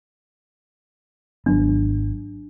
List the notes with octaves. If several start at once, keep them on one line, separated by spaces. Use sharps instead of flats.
G#1 F#3 B3 D4